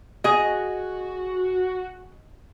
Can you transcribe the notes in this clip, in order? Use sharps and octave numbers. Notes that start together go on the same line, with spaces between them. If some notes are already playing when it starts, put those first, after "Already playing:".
F#4 G#4 D#5